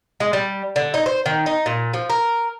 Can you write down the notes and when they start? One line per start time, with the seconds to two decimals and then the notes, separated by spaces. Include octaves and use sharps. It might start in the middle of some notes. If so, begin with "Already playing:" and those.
0.20 G#3
0.33 G3
0.76 D3
0.94 D#4
1.06 C5
1.26 D#3
1.46 D#4
1.66 A#2
1.94 F3
2.10 A#4